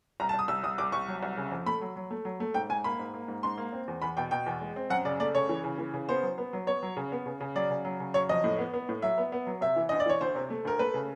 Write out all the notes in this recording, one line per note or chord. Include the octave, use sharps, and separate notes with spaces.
C2 A#5
A5
C2
D#6
C2 E6
C2 D#6
C2 D6
C2 C#6
F#3
C2
C#3
F2
A3 B5
F#3
F#3
A3
F#3
A3
G#2 G5
G#2 G#5
A#3 B5
G#2
A#3
G#2
G#2 C6
A#3
C4
E2
E2 B5
B2 G5
B2 G5
E2
G#3
C4
F#2 F#5
C#3 D5
A3 D5
C#3 C#5
E3
C#3
E3
C#3
B3 C5
F#3
B3
F#3
B3 C#5
F#3
C#3
B3
C#3
C#3
F#3 D5
C#3
F#3
C#3
F#3 C#5
F2 D#5
A2
B3
B3
A2
F#3 E5
B3
B3
F#3
C3 E5
E3
D2 D#5
D5
E3 C#5
D2 C5
C3
A3
D2 A#4
A3 B4
C#3